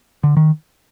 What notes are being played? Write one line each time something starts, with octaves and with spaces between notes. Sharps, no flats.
D3
D#3